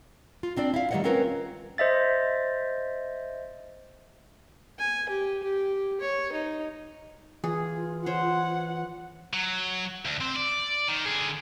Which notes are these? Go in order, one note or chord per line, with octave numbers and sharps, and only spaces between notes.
F4
A#3 C4 D4 D5
E4 F5
D#3 G3 A3 C#5 D#5 F#5
C4 C#4 F4 A#4 B4 C#5
C5 D#5 E5 A6
G#5
G4
G4
C#5
D#4
E3 F4 G#4
C5 C#5 F#5
F#3
D2
C4
D5
D#3
D3 G#4